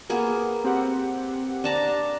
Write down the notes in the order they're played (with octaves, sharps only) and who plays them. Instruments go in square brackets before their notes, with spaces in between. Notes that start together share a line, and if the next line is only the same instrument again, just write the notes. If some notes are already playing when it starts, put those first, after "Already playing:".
[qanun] A#3 B3 G#4
[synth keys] C4 G4 F#5
[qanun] D4 A5 A#5